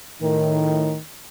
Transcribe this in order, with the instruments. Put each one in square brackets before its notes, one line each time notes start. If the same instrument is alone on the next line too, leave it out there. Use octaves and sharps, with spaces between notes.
[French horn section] A2 D#3